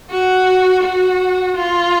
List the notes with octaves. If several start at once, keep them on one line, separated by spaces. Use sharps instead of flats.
F#4
F#4
F4